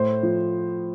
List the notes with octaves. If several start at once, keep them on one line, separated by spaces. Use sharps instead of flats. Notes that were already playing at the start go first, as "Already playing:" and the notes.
Already playing: A2 C5
F3